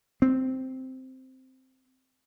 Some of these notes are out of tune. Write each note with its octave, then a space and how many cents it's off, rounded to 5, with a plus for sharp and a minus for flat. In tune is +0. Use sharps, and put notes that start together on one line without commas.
C4 -5